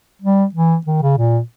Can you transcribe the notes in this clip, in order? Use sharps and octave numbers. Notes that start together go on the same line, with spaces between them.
G3
E3
D#3
C#3
A#2